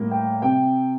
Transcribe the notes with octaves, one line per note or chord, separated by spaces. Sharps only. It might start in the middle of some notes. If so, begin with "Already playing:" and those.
Already playing: A2 G3 A#3
G5
C3 G5